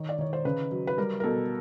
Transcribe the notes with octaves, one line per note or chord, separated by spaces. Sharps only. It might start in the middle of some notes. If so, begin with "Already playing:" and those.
Already playing: D#3 C#5
D5
D#3 C#5
C5
C#3 B4
F#3
B4
G3 A#4
A#4
B2 A4